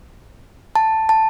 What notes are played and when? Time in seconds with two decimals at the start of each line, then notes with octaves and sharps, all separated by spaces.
0.76 A5
1.09 A5